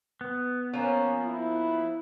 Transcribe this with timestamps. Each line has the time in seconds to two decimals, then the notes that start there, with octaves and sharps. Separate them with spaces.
0.21 B3
0.73 F3 A#3 C#4
1.26 E4